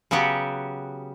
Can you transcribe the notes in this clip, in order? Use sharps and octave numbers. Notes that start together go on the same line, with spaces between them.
C#3 F#3 B3 F#4 G4